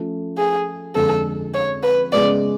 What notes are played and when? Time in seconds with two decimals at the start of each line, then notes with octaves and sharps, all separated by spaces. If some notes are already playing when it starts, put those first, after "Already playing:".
Already playing: F3 A3 C#4
0.38 G#4
0.95 F2 D3 G#3 A4
1.54 C#5
1.83 B4
2.12 C#3 G#3 B3 D5